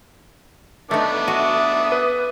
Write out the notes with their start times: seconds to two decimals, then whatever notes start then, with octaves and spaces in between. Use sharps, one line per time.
0.91 A3 B3 D4 D#4 D6
1.28 F#4 E5 D#6 D#7
1.92 B4